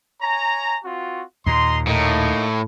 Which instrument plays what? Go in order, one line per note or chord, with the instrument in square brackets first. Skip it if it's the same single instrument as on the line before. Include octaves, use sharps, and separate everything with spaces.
[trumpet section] C#5 G#5 A#5
C4 F4 F#4
[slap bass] D#2 A#2 [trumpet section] D#5 A#5 C6
[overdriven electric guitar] A2 [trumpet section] A#3 D#4